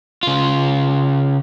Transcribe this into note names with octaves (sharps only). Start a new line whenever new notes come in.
C#3 F4